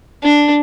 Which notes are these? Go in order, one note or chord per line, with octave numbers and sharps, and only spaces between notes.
D4